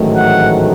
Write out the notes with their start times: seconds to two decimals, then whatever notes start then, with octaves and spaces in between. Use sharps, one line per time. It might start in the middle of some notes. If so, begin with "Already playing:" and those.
Already playing: A1 G#2 D#3 F#3 A3
0.15 F#5